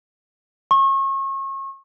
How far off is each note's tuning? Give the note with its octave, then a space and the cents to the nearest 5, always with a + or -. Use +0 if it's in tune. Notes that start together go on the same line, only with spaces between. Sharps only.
C#6 -35